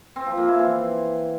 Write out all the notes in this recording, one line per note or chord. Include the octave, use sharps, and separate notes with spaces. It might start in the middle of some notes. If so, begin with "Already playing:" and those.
C4
F3
A#3
E4
E3